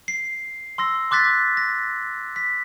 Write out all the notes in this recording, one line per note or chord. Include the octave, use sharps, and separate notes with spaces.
C7
C6 E6 A#6
C6 D6 F#6 A6 B6
A#6
B6